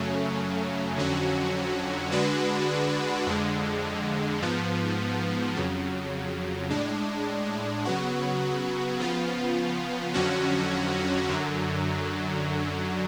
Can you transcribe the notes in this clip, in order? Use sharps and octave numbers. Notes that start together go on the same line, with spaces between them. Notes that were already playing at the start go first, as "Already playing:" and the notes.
Already playing: F#2 C#3 F#3 A3 C#4
F2 D3 F#3 C#4 F#4
D3 G#3 D4 F#4 B4
F2 D3 G#3
G#2 F3 B3
F2 C#3 F#3
A2 G#3 D4
C#3 F#3 B3 F#4
C#3 F3 B3 F4
F2 D3 F#3 C#4 F#4
F#2 D3 F#3